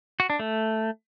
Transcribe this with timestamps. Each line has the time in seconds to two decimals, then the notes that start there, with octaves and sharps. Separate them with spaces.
0.20 F#4
0.30 D4
0.39 A3